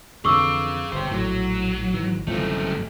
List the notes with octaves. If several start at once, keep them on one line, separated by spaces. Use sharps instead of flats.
F2 D3 E3 G#4 F5 C#6 D6 E6
G1 C#3 G4 C5
A#1 A2 F#3
G#1 G#2 E3
G1 C2 F#2 C#3 E3 F3 A3